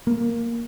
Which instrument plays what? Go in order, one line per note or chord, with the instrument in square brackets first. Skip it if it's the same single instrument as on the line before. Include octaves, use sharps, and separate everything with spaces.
[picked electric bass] A#3